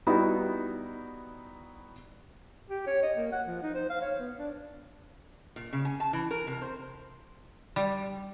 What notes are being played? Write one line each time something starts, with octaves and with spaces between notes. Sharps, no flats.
G3 B3 D#4 E4 F#4
G4
C#5
D#5
A#3
F#5
F3
D#4
C5
F5
C#5
B3
D4
A#2
C#3
G#5
A5
E3
A#4
C3
C5
G3